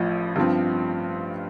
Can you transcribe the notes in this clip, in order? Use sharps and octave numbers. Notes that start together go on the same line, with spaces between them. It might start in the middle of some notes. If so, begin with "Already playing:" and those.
Already playing: A1 A2 F3
G2 F3 C4